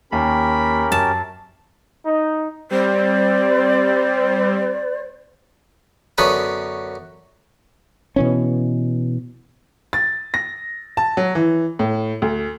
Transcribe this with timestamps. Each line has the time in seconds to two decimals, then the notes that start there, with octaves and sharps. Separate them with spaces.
0.12 D#2 C#4 G4 A#4 B5
0.92 F#2 A5
2.05 D#4
2.71 G3 C4 C5 D5
6.18 F#2 D3 B3 B5 C#6 D#6
8.16 B2 E3 C#4
9.93 A6
10.34 A#6
10.97 A5
11.17 F#3
11.35 E3
11.79 A2
12.22 D2